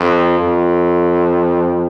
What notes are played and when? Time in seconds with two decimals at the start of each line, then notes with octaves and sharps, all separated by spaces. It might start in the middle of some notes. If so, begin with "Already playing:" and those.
Already playing: F2
0.39 F2